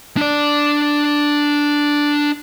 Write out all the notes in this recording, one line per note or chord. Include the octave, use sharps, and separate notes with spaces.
D4 D5